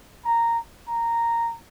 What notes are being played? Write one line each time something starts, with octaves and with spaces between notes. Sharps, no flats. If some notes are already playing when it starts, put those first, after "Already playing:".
A#5
A#5